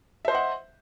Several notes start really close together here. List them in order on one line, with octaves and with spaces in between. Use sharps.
E5 C5 D#5 F#5